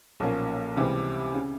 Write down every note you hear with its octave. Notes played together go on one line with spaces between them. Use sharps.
B1 A#2 F3 A#3 C#4
C#2 C3 E3 G3 C4
C#3